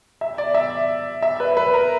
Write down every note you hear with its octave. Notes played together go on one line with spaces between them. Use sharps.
E5
D5
E5
E5
B4
B4
A#4